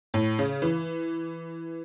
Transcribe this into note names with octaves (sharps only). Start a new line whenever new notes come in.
A2
C#3
E3